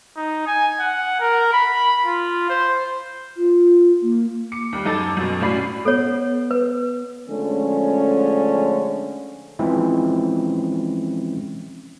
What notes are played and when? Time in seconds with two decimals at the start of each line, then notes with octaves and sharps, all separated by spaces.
0.16 D#4
0.47 G#5
0.80 F#5
1.20 A#4
1.54 B5
2.06 F4
2.50 C5
3.37 F4
4.03 A#3
4.52 D6 C#7
4.72 D#2 G3
4.85 F#2 D#4 A4 A5 D6 A6
5.17 F#2 B2
5.41 A2 C#4 F#4 D5 B5 C7
5.85 B3 A4 C#5
6.51 B4
7.29 D3 F3 G#3 A3 C#4
9.59 E3 F3 G#3 C4 C#4 E4